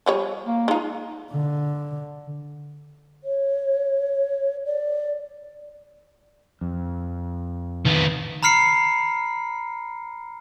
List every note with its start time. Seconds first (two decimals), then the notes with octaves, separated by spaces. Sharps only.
0.06 F3 G3 C#5
0.45 A#3
0.68 G#3 D#4 F4
1.31 D3
3.24 C#5
4.65 D5
6.61 F2
7.85 D#3 B3
8.43 A#5 B5 F6 C7 C#7